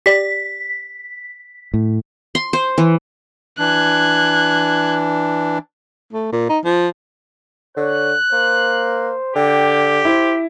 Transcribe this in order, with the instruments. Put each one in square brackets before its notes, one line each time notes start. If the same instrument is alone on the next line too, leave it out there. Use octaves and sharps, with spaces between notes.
[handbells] G4 D5 [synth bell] B6
[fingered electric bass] A2
[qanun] C6
C5
E3
[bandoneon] E3 D4 [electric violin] F#6 G#6
[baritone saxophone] A3
A#2
D#4
F3
[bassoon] D3 [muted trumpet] C#5 [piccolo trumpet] F#6
[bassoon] A#3 [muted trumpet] C5
[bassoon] D3 [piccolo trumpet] G4 [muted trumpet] G5
[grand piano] E4 [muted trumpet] C5